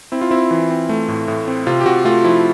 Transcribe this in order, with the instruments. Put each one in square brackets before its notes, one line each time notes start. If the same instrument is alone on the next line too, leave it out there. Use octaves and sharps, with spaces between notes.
[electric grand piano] C4 E4
F4
C4 E4
E3
C4
A3
A2
A2
C4
C3 F4
G4
C3 F#4
A3 F4
F3 E4